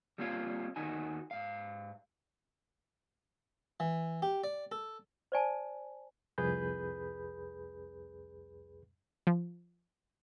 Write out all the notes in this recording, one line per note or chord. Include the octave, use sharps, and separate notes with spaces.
G3 A#3 C4 F4 C#5 F5
D#2 D#3 D#4 F#4 G#5
G#2 F5
E3
G4
D5
A4
C5 D5 G#5 A5
C2 F2 G#4 B4 B5 G6
F3